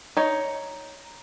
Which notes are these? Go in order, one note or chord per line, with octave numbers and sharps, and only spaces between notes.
D#4 C#5